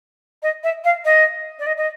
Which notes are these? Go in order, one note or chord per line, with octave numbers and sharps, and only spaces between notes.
D#5
E5
F5
D#5
D5
D#5
D#5